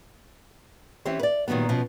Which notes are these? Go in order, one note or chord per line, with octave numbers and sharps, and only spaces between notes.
E3 C4 C#4 G4 C5
B4 D5
A#2 D#3 F#3 G3 B3
B2 F3 C#4